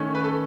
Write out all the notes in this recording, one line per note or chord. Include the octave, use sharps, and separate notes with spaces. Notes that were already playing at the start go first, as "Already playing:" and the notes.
Already playing: D#3 A3 C#4
B4
A4